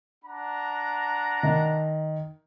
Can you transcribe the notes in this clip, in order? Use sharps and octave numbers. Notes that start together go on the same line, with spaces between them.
D4 F#5 A#5
D#3